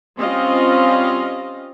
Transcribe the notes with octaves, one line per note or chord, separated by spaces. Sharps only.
G3 C4 C#4 F4 D#5 F5